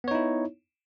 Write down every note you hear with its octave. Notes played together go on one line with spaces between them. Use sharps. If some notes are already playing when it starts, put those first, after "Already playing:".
B3 D#4 E4 C#5